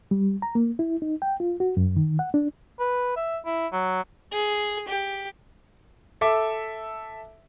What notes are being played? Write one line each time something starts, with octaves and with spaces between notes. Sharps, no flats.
G3
A#5
A#3
E4
D#4
G5
F4
F#4
F#2
D#3
F#5
D4
B4
E5
E4
F#3
G#4
G4
A4 E5 D6